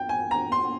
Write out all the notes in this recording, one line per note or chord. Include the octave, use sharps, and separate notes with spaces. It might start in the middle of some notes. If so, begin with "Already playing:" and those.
Already playing: G5
G#5
A#5
C6